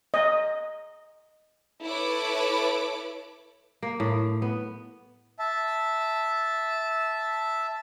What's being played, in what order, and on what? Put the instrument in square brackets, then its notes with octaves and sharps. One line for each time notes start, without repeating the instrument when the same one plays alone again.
[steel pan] D#5
[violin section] E4 A4 B4 C#5 D6
[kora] A#3
A2
B3
[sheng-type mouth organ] E5 A5